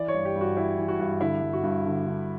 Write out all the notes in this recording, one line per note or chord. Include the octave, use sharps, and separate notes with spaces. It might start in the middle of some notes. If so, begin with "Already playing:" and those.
Already playing: E3 D5
C#5
G2
G4
G2
F#4
E3 E4
E3
F#4
G2
D3 E4
G2
F#4
G2
D3
D3